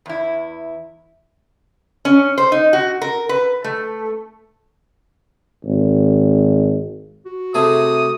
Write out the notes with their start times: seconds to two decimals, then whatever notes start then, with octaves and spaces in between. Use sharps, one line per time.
0.06 E2 E4
2.05 C#4
2.38 C5
2.52 D#4
2.73 F#4
3.02 A#4
3.29 B4
3.64 A3
5.65 G#1
7.26 F#4
7.54 C3 A3 G#4 D#6